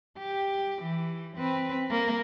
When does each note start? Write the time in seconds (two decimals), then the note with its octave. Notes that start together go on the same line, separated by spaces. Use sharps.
0.19 G4
0.82 E3
1.37 C4 B4
1.91 A#3